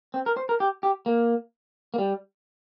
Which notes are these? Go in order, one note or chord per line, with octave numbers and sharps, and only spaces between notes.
C4
A#4
C5
A#4
G4
G4
A#3
A#3
G3